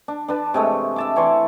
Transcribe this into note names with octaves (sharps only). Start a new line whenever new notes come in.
D4
D4 B4 A5
C3 G#3 A3
E5 A5 D6
E3 C#5 D5 C6